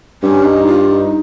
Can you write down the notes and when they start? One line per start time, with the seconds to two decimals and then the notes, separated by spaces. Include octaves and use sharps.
0.23 G2 C#4
0.45 D#4
0.67 F4
0.88 F4
0.91 D#4